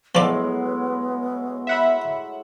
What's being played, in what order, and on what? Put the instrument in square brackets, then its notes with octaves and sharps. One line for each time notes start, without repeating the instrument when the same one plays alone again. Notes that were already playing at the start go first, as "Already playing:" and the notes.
[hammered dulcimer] A2 F#3 G#3 [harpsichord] F3 D5 [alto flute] B3
[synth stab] E5 F#5 B5